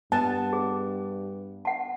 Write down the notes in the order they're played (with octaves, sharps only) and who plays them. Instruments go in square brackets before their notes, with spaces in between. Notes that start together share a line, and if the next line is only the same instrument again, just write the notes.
[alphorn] G2 [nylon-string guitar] B3 [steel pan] A5
[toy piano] G#4
F#5 A5